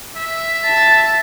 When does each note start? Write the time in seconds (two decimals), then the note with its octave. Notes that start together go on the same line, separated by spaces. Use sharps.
0.16 E5
0.65 A5 A6